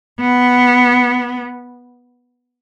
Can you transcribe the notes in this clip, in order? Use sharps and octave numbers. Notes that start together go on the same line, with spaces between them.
B3